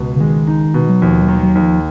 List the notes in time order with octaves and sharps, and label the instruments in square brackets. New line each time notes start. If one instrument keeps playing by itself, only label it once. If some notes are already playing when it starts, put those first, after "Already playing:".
Already playing: [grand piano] C#2 B2
[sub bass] C#3
[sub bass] D#3 [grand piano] G#3
[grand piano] D#4
B2
[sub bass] F#3
[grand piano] D#2 [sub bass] F3
[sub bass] F#3
[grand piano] D#3
[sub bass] F#3
[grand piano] D#2
[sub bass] F3